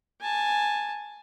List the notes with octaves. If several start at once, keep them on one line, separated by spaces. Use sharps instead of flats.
G#5 A5